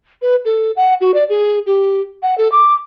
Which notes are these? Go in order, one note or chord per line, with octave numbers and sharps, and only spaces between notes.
B4
A4
F#5
F#4
D5
G#4
G4
F#5
A4
D6